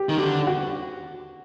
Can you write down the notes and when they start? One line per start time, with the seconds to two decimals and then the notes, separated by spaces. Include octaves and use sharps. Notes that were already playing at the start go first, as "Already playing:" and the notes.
Already playing: G4
0.09 D#3
0.18 D3 G4
0.47 F#4